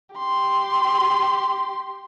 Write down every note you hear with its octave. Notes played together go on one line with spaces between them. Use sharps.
G4 C6